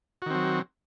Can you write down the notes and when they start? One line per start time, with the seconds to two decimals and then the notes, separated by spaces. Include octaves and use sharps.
0.22 F#4
0.26 D#3
0.30 C4
0.35 F#3